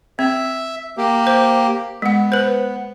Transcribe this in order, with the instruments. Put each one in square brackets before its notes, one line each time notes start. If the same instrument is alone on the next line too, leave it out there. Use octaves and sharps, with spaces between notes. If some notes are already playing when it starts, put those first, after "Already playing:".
[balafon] C4 [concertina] E5
[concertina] A#3 G4
[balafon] C5
[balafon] G#3 F#5 [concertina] B3
[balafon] B4 C5